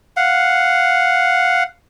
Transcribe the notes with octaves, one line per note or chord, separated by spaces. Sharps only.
F5 F#5